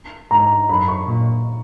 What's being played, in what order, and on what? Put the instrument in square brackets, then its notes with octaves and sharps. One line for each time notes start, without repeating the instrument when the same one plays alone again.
[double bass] G#2 [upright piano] A#5
[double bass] F#2 [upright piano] B5
[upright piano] C#6
[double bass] A#2